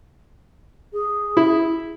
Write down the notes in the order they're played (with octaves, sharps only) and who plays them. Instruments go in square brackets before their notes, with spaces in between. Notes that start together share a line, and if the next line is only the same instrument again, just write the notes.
[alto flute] G#4
[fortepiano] E4